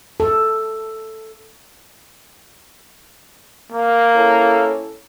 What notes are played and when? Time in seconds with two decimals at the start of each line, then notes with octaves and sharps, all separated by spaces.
0.20 A4
3.72 A#3
4.15 C#4 E4 A4